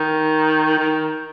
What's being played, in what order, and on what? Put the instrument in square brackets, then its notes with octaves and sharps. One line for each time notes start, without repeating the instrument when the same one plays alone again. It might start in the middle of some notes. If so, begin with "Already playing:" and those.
Already playing: [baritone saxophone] D#3
D#3